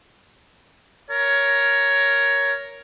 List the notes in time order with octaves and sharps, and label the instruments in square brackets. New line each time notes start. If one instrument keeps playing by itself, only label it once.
[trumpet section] A#4 C#5